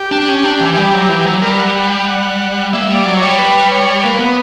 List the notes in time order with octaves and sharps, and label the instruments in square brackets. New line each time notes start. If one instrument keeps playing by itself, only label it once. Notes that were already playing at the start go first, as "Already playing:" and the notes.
Already playing: [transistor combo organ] G4
[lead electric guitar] D4
C#4
D4
E3
G3
F#3
E3
F#3
[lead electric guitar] G3 [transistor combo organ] A#4
[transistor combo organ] F#5
F#5
G5
F#5
[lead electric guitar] A#3 [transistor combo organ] E5
[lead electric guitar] G3
[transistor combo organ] D5
[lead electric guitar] F#3
[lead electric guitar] G3 [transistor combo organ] C#5
[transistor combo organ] B4
C#5
[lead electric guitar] A#3 [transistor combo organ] B4
[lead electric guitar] B3